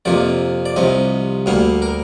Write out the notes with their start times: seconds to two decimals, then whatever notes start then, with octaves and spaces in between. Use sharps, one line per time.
0.05 F2 C3 F3 A#3 D5
0.66 D5
0.76 C2 C3 F3 D#5
1.46 D2 D3 G3 A#3 F5
1.82 A#4